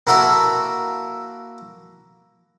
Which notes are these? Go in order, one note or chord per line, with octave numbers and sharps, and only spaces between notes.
A#3 E4 F#4 A4 A#4